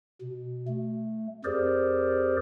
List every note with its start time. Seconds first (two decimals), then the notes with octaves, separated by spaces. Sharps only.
0.21 B2
0.68 A3
1.44 F2 G4 G#4 A#4 C5 D5